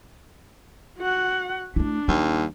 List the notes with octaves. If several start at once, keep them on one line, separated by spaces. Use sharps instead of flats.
F#4 F#5
A3 D4 E4
D#2 G3